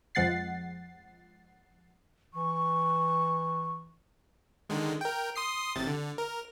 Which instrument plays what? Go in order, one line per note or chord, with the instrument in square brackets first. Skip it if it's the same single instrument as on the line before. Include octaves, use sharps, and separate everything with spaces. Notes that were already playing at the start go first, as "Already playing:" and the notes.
[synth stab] F2 F3 G#3 F#5 A6 C7
[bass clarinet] E3 [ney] C#6
[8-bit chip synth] D3 D#3 G#3
A#4 G5
C6 D#6 C7
A1 C3 A6
D3
A#4